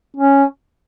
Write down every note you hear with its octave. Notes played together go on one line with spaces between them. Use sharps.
C#4